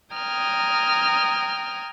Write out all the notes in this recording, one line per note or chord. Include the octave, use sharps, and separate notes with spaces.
G5 A#5 D#6 F6 G#6